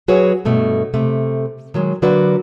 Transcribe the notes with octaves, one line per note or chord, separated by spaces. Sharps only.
F#3 F#4 G#4 B4 C#5
G2 B2 A3
C3 A3
D#3 F#3 G#3
D3 F#3 A#3 F#4 B4 D5